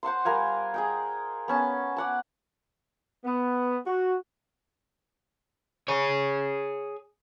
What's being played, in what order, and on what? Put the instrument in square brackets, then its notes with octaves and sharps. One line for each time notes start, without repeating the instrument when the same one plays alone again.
[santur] C5 F#5 A5 C6
G3 A#4 F5 G#5
G#4 D#5 G5
B3 C#4 A5
D5 F#5 A5
[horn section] B3
F#4
[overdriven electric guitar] G#4 C#5